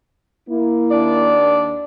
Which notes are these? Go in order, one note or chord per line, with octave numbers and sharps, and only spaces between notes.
A#3 E4
D#2 D4 D5